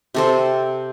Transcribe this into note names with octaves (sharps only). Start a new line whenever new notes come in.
C3 A4 C5